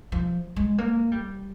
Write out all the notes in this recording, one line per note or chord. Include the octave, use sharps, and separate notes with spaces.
F3
G#3
A#3
G3